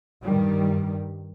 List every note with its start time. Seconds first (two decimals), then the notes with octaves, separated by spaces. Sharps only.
0.25 G2 D#3 G3